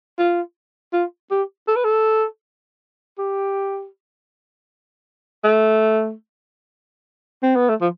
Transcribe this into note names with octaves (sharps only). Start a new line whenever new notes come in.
F4
F4
G4
A4
B4
A4
G4
A3
C4
B3
A3
F3